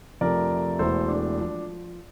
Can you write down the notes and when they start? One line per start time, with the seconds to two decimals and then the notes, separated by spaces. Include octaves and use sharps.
0.21 F2 C3 F3 A3 A#4 D5
0.79 E1 E2 E3 A3 A4 C5
1.08 D4
1.40 F3